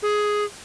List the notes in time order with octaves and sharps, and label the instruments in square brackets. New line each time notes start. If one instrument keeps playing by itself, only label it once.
[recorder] G#4